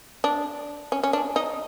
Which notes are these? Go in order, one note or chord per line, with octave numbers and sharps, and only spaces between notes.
D4
C#4
C#4
D4
D#4